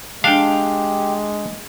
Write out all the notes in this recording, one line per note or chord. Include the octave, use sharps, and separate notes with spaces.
G#3 D4 G4 F5 G5